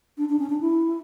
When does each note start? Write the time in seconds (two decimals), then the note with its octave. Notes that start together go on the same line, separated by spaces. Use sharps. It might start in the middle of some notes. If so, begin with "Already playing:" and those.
0.18 D4
0.29 D4
0.39 C#4
0.50 D4
0.61 E4